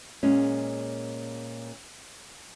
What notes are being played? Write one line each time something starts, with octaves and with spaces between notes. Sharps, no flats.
A#2 G#3 C#4